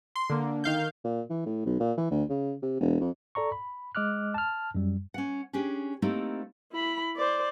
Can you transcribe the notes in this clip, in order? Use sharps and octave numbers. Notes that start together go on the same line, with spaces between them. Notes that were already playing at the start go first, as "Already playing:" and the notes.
C6
D3 A#3
D#3 F5 G6
A#2
E3
A2
B1
A#2
E3
D2
C#3
C3
E1
F2
A4 D5 A#5 C#6
B5
G#3 D#5 D6 F6 F#6
A5 F6
F#2 G3
C#4 F#5
C#4 D4 G4 G#4
A3 A#3 C4 D#4 E4 G4
E4 B5
C5 D5